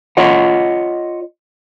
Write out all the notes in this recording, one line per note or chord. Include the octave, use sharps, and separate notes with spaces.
F4 C#5 D#5 F#5